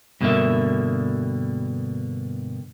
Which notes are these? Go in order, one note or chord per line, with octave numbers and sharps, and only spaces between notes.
G2 B2 D3 F#3 A#3 E5